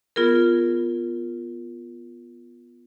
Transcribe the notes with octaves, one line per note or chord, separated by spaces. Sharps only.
B3 F4 G#4 A#4